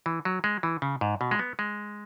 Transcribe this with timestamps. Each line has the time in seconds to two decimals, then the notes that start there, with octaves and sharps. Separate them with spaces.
0.06 E3
0.25 F#3
0.44 G#3
0.63 E3
0.82 C#3
1.01 G#2
1.21 B2
1.31 G#3
1.39 B3
1.59 G#3